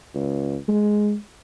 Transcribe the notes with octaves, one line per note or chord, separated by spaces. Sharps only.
C#2
G#3